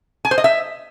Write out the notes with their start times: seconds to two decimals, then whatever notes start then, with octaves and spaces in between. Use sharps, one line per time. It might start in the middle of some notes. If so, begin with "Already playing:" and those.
0.25 G#5
0.31 C5
0.38 D#5
0.44 E5